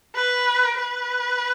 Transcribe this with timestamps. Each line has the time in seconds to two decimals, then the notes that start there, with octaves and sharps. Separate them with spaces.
0.16 B4
0.78 B4